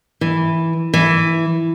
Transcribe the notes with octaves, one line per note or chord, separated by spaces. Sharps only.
E3
E3